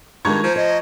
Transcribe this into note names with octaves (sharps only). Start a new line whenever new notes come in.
G2 D#3 G#3 F4 A#5 C#6 G#6
F3 C5
C5 D#5